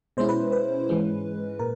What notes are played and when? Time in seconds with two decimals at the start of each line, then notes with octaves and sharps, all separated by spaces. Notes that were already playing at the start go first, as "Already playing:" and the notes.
0.17 B2 G#3 C#4 E4 C5
0.29 B4
0.52 B4
0.89 G#2 E3 G#3 C#4
1.59 A#2 A#4